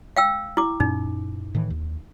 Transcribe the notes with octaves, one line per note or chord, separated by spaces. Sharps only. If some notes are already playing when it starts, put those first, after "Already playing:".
F5 G5 E6
E4 D6
F#2 A#2 C#4 D#4
A2 D#3 E3
D#2